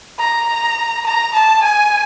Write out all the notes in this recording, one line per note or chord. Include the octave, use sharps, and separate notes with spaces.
A#5
A#5
A5
G#5